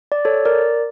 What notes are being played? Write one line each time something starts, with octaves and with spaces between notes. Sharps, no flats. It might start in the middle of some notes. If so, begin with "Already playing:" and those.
D5
A4 C#5
A#4 D5